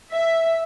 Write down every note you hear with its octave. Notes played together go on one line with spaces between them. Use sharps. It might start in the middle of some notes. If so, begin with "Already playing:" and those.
E5